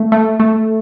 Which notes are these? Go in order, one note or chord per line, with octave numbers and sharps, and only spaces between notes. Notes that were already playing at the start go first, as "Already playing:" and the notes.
Already playing: A3
A3
A3